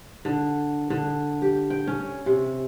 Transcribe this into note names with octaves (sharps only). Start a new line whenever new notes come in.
D3
D3
G4
G5
C#4
C3